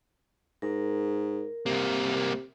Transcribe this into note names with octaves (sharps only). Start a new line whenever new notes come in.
G#2 A#4
C2 C3 A#3